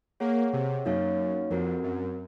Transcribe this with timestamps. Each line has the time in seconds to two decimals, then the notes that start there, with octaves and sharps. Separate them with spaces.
0.20 A#3 G#4 C#5 F#5
0.53 C3
0.85 F#2 A#3 D#4 F#4 C#5 F5
1.50 F2 C4 F#4 A#4
1.83 F#2